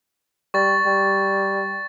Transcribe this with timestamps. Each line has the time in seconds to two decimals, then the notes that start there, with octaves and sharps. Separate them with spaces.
0.54 G3 C#6 A6
0.86 G3